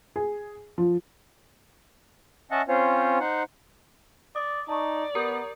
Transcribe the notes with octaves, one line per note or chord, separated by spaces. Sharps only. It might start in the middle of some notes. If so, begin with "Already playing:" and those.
G#4
F3
C#4 D#5 E5 F#5 A5
C4 C#4 F4 C5 C#5
D#4 C5 F#5
D5 D#6
D#4 D5 A5 A#5 C#6
B3 G4 A#4 A#5 D#6 G6